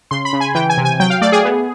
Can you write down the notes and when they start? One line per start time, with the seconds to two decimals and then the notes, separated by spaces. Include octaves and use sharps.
0.11 C#3 C6
0.25 B5
0.33 C#3
0.40 G#5
0.55 E3 G5
0.70 G#5
0.77 C3
0.85 G#5
1.00 F#3 G5
1.10 F5
1.21 A3 D5
1.32 G#4
1.45 B3